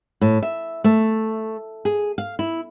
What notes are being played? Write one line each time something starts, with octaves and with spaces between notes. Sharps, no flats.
A2
E5
A3
G#4
F5
E4